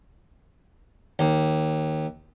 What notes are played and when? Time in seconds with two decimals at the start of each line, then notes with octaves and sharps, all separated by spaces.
1.19 D#2